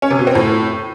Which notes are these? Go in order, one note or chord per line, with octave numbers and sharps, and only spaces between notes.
C#4
C3
B2
C4
A2